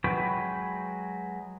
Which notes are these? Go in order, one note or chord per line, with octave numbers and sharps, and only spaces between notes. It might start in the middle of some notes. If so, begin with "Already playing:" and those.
F#3 G#3 F#4 B4 G5